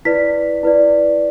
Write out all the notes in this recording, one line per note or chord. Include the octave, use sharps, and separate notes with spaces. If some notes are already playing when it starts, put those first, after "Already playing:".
E4 B4 D5 B6
E4 B4 D5